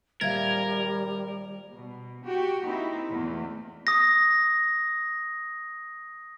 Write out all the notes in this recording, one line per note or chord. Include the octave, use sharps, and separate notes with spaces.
D#1 G3 A#4 E5 F5 G#6
B2
F#4 G4
A#3 C4 D#4 E4
E2 A3
D#6 A#6